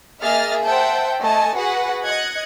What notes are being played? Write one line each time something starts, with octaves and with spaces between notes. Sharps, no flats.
A#3 G#4 D#5 E5 F6 A6
C5 E5 F#5 G5 A5 G6
A3 D#5 G#5 A5
F#4 G#4 B4 F#5
D#5 F#6 G#6 C#7